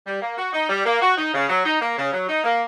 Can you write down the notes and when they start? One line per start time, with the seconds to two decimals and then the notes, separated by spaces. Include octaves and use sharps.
0.07 G3
0.22 A#3
0.38 F#4
0.53 D#4
0.69 G3
0.86 A#3
1.02 F#4
1.18 D#4
1.34 C#3
1.49 F#3
1.65 D#4
1.81 A#3
1.98 C#3
2.13 F#3
2.29 D#4
2.44 A#3